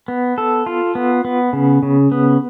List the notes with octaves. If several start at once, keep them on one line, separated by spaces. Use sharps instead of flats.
B3
A4
F4
B3
B3
C#3
C#3
B3